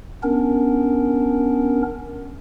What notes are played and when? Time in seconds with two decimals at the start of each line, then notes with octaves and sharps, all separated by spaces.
0.23 B3 C#4 D4 A#4